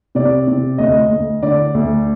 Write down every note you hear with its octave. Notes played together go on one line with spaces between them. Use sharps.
C3 D5
C3
D2 D#5
D2
D3 D5
D2